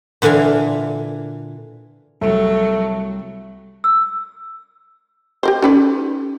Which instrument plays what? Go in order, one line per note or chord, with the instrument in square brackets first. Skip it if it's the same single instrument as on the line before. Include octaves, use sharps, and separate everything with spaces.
[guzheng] A#2 D3 E3 F5 G#5
[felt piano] C2 A4 [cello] F#3 [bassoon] A3
[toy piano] E6
[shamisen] G4 A#4 C5
[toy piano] C#4 D#4 G4 [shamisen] A4 B4 D5